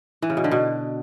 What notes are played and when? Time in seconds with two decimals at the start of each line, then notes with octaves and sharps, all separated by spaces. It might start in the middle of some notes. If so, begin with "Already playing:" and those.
0.22 E3
0.30 C#3
0.37 B2
0.44 D3
0.51 B2